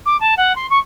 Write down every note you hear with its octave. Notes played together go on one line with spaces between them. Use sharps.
D6
A5
F#5
C6
C#6